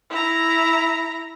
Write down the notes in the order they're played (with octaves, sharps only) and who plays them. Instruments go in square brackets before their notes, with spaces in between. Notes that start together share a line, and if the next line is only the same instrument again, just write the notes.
[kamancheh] E4 A#5